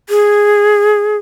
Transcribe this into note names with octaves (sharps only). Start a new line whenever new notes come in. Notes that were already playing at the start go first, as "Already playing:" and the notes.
G#4